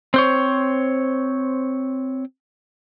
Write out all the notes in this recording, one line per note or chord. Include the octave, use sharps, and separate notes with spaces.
C4 C5 C#5